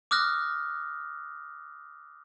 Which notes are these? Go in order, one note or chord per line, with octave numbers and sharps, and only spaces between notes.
D6 D#6 F6 F#6 A#6